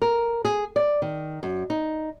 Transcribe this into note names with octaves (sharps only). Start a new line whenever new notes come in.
A#4
G#4
D5
D#3
F#2
D#4